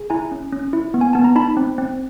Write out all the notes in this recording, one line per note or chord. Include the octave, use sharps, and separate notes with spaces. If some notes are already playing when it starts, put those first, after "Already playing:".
Already playing: G#4
E4 G#5 A#5
C#4
C#4
E4
B3
G#5
B3 A5
A#5
D#4 A5 B5
C4
C4